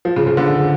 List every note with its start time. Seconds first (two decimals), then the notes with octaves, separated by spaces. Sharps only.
0.05 F3
0.16 C#3
0.27 C#3
0.37 D3